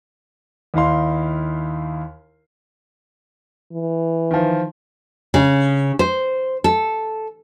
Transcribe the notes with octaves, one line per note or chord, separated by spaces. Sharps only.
D#2 D#4 E4 F5 C6
E3
D#3 F3
C#3
C5
A4